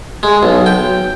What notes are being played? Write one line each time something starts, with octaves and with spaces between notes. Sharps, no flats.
G#3
B1
G5